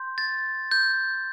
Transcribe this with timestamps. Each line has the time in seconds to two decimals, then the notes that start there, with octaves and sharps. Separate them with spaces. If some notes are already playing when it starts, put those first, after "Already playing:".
Already playing: C6 G6
0.18 A6
0.71 G6